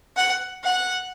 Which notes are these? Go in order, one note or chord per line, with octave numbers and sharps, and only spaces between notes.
F#5
F#5